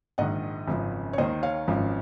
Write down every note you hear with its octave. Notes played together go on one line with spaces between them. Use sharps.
A#1 G#2 D#3 D#5 F#5
G#1 F#2 C#3 F3
C#5
D#2 D#3 C5 D#5
C#5 F5
G#1 F#2 F3